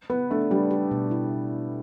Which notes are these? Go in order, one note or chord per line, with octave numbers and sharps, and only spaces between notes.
B3 B4
A3 D4
G3 D4
G4
B2
E4